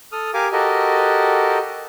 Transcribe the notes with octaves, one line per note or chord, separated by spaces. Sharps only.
A4 D#6 F6
G4 A#4 F5 G#5 D6
F#4 G4 A4 A#4 D#5